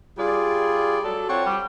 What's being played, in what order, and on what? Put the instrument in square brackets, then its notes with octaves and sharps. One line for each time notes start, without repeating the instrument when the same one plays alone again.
[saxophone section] G3 D5 [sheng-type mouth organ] F4 G#4
[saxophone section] F#3 [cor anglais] A4 [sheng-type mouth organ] D5
[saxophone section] C4 F4 F#5 [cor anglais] C#5
[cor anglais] G3 [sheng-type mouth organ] G5